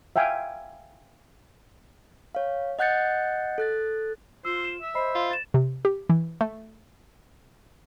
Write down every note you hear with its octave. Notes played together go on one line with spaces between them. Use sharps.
E5 F5 G5 G#5
C#5 F5
D#5 F#5 F#6 G6 A6 C#7
A4 F#6 A6
F4 C5 E6
E7
E5
C5 D#5 B5 C7
F4
A6 E7
C3
G4
E3
A3